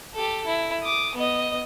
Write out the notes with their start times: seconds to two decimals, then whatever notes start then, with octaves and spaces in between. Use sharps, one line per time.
0.15 G4 A4
0.46 E4
0.82 D6 D#6
1.15 B3 D#5